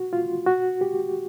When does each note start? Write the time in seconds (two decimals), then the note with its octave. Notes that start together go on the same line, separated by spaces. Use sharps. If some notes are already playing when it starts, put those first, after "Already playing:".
Already playing: F#4
0.13 F4
0.47 F#4
0.81 G4